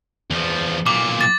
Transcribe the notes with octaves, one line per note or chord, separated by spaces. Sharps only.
E2 F3
B1 A#2 D6
D6 A6